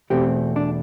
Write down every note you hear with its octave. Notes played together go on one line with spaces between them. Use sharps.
E2 B2 A3 C4 G4
D4